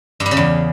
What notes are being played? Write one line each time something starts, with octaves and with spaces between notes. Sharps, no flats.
G2
G3
C#3
E2